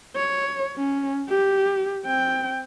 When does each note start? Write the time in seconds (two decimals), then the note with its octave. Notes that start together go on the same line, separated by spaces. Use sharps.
0.16 C#5
0.76 C#4
1.29 G4
2.05 C4 G5